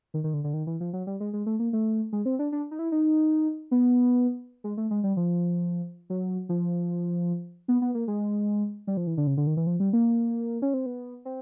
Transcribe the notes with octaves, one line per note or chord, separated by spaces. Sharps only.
D#3
D#3
D3
D3
D#3
E3
F3
F#3
G3
G#3
G#3
A3
A#3
A3
G#3
C4
D4
D4
D#4
E4
D#4
B3
G#3
A3
G#3
G3
F3
F#3
F3
B3
B3
A#3
G#3
G3
F3
E3
D3
C#3
D3
D#3
E3
F3
G3
A#3
C#4
C4
B3
C4